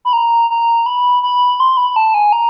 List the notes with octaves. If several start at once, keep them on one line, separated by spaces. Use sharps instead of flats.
B5
A#5
A#5
B5
B5
C6
B5
A5
G#5
A#5